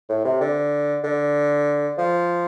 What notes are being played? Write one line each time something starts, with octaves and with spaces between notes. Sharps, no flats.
A2
C3
D3
D3
F3